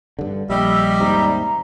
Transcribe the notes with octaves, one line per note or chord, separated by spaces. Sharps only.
G2 D3
A#1 G3 G4 D#5 E5 E6
D#2 G#2 C3 A#5